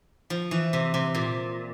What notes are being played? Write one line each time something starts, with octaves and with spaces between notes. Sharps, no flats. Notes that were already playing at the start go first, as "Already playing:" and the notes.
F3
E3
C3
C3
A#2